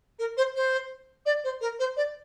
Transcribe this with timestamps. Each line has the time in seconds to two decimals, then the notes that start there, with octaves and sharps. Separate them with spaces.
0.19 A#4
0.37 C5
0.55 C5
1.25 D5
1.44 C5
1.61 A#4
1.79 C5
1.96 D5